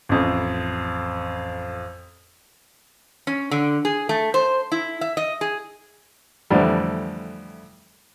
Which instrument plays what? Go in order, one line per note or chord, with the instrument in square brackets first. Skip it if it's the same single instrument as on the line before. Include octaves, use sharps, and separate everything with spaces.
[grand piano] A1 F2
[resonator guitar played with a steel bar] C#4
D3
G#4
A3
C5
E4
E5
D#5
G#4
[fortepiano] F2 A2 D3 E3 G3